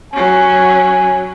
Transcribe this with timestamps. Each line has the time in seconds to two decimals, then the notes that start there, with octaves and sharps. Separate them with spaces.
0.14 F#3 C#4 G#5